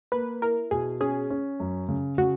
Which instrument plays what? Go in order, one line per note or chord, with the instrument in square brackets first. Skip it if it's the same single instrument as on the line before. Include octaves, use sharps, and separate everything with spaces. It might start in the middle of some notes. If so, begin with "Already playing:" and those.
[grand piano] A#3 [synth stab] B4
[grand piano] E4 [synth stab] A#4
[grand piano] B2 [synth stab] G#4
[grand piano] C#4 [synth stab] G#4
[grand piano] C#4
F#2
C#3
[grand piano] C#3 [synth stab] F#4